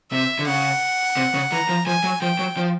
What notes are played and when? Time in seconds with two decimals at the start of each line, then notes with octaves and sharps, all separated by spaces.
0.12 C3 E5
0.39 D3
0.47 C#3 F#5
1.17 C3
1.34 C#3
1.52 E3 A#5
1.69 F3
1.86 F3 G#5
2.04 F#3
2.22 F3 G5
2.39 F#3
2.57 F3